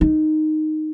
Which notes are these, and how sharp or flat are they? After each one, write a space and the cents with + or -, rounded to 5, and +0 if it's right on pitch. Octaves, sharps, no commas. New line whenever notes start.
D#4 -5